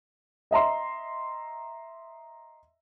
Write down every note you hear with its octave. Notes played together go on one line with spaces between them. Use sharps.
D#5 E5 A#5 C6